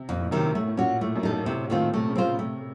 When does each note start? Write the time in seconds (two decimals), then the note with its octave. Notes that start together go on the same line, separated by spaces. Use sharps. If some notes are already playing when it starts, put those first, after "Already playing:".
Already playing: C3
0.08 F2 A#2
0.20 A2
0.31 F#2 C3 D#3
0.43 A2
0.54 A2 A3
0.67 A2
0.77 A#2 C#4 F#4
1.01 A2 A3
1.16 F#2
1.23 D#4 A4
1.31 F#2
1.46 A2 C3
1.64 A2
1.70 A#2 D#3 A3 C4 F4
1.93 C3 A3
2.09 C#3
2.15 C4 F4 C5
2.39 C3 A3